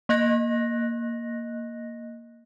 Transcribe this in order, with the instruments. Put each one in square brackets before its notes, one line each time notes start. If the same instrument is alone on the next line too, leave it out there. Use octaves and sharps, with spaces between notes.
[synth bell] A#3 D#5 F#6 A#6